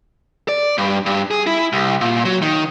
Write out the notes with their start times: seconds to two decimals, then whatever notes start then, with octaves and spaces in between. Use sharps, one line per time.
0.49 D5
0.78 G2
1.06 G2
1.31 G#4
1.47 E4
1.73 C2
2.01 A#2
2.25 F#3
2.42 D#3